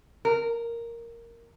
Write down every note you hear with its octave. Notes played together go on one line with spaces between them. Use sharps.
A#4